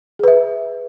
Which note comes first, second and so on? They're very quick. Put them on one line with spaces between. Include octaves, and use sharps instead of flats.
G#4 B4 E5